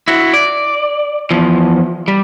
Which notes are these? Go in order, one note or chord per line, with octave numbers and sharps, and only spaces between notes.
E4 F#4
D5
E2 F3
G3